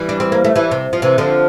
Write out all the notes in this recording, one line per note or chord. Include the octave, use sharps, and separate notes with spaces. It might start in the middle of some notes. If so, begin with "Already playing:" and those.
Already playing: E3 G3
D4
C4
A#3
A3
E3 G3
C3
F3
C3 E3
D3 F3